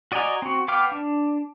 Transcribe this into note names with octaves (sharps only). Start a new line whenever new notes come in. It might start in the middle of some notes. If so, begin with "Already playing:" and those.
F#4 D5 D#5 G#5 A#5
C4 F#4
B3 F5 G5 D6 F6
D4